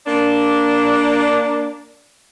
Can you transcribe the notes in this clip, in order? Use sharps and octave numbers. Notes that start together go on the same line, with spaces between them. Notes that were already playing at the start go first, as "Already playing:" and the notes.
A#3 D4